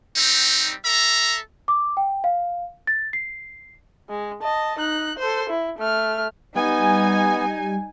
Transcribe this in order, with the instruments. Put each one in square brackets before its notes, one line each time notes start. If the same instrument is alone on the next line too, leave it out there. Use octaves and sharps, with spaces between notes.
[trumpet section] G3 C4 D#4
A4 E5 A#5
[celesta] D6
G5
F5
A6
C7
[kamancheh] G#3
D#5 A5
D#4 F#6
A4 C5
E4
A3 F6
[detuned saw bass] G3 [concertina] B3 [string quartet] D#4 [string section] G#5